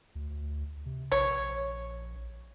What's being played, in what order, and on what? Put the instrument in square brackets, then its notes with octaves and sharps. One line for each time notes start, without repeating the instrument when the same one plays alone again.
[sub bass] D2
C3
[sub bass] A#1 [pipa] C#5